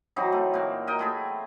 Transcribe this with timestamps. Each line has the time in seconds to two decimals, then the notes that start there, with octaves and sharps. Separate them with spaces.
0.16 E3 F#3 C4 D#4
0.32 A3
0.54 A#2 C4
0.87 A#4 D#5 G5
0.99 A3 E4 G#4